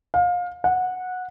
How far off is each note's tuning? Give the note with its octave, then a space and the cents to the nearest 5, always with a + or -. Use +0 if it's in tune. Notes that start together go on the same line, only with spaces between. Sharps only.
F5 +30
F#5 -15